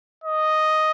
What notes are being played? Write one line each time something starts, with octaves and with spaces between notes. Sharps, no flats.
D#5